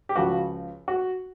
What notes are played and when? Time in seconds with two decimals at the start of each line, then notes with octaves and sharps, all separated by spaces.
0.09 G4
0.16 C#2 C#3 F3 F#4
0.88 F#4